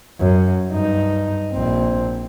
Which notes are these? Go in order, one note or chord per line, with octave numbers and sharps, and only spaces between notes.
F#2
G2 D#4
A#1 C4